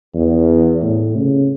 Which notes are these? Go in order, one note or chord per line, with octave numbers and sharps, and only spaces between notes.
E2
A2
C#3